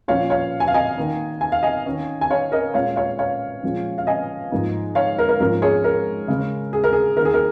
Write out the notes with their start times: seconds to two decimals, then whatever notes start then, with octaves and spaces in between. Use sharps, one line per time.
0.08 A#2 F3 C#4 C#5 F5
0.30 C#5 F5
0.60 G#5
0.68 F5
0.74 D#5 G#5
0.97 D#3 A#3 D#4
1.41 G#5
1.52 F5
1.63 D#5 G#5
1.86 D#3 C#4
2.21 G#5
2.30 C#5 F5
2.52 A#4 D#5
2.74 A#2 G#3 C#4 C#5 F5
2.96 C#5 F5
3.19 C#5 F5
3.63 A#2 F3 G#3 C#4
3.98 F5
4.07 D#5 G#5
4.51 G#2 F3 A#3 D#4
4.95 C#5 F5
5.18 A#4
5.29 A#4
5.40 G#2 F3 A#3 C#4 A#4
5.62 G#4 C#5
5.84 A#4
6.28 C#3 G#3 C#4
6.73 G#4
6.84 A#4
6.93 G#4
7.17 D#3 A#3 D#4 A#4
7.25 G#4
7.34 A#4